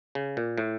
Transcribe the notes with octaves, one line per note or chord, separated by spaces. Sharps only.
C#3
A#2
A2